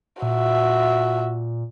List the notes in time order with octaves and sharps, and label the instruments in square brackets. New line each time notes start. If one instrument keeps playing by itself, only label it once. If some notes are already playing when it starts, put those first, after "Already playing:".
[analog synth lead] A#2 [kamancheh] F#4 E5